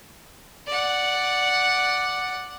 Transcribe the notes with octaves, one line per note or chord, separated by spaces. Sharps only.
D5 F#5